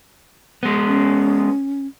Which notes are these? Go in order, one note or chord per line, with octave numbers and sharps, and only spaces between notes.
G#3 B3
C#4